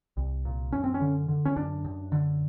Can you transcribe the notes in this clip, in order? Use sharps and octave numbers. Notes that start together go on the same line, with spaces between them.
C2
A#2
F#2 C#4
C4
C#4
D3
D3
C#4
F#2 D4
F#2
D3